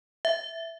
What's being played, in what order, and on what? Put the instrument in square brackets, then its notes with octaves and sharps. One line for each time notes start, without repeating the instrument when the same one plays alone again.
[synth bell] E5